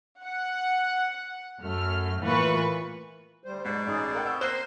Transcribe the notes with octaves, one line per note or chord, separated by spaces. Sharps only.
F#5
F#2 A3 F6
A2 E3 A#3 F4 B4 C#6
D2 G3 C5
G#2 B2 F#3 D5
A1 D#4 G#4 D5
A#4 F#5 G5
C4 C#6 D#6 E6 G6
A#3 C5 F#6 G7